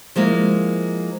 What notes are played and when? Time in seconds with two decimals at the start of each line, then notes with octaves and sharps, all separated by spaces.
0.16 F3 G#3 A#3 E4